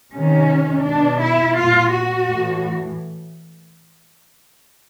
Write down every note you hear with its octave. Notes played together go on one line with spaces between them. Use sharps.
C3 D#3 C#4
B2 D4
E4
A#2 F4
F#4
A2 E3